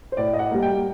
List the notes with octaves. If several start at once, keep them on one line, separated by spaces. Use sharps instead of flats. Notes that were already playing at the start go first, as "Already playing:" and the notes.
C5
A2 D5
D#5
F#5
G3 A#3
G5